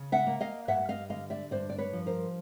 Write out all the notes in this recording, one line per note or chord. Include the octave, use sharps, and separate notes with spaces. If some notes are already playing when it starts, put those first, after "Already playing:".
Already playing: C#3
E5 F#5
A#3
D#5 F5
G2 E5 F#5
D#5 F5
D3 D#5 F5
D5 E5
G2 C5 D5
D5
B4 C#5
F3
A#4 C5